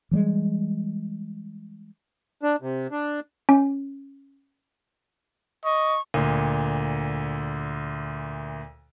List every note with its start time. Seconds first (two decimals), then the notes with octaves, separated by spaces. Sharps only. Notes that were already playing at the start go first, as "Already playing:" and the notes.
0.11 E3 G3 G#3
2.43 D4
2.62 C3
2.91 D4
3.49 C#4
5.64 D#5 C#6
6.14 D2 A#2